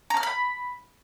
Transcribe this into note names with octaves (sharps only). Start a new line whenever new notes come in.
A#5
F6
B5